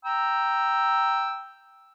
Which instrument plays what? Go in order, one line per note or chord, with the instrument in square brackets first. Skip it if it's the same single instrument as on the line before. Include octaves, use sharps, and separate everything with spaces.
[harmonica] G5 A#5 E6